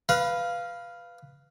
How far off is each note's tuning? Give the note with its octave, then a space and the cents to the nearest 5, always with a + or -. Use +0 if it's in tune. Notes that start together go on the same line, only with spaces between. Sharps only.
B4 +0 F5 -5 A#5 +45